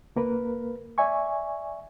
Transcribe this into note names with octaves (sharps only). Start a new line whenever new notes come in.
C#2 A#3 A#4 B4
D5 E5 G#5 C#6